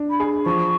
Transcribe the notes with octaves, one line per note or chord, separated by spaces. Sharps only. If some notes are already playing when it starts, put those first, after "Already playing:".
Already playing: D4
B5
G#4
F3 C#6